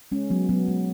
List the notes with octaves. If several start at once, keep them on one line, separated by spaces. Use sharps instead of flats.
G#3 C#4
F#3 B3
F#3 B3
G#3